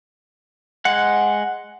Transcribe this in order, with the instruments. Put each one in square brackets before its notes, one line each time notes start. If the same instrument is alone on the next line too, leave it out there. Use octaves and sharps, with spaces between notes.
[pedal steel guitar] G#3 F#5